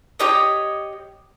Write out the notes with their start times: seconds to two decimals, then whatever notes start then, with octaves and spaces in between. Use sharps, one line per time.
0.19 G4 C#5 D#5